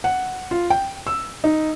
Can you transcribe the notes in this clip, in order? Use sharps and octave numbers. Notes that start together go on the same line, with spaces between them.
F#5
F4
G5
E6
D#4